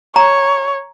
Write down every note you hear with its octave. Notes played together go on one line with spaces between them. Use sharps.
C#5 A#5